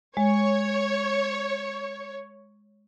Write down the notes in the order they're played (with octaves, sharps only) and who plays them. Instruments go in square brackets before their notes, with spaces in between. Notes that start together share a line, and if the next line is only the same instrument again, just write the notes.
[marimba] G#3 [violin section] C#5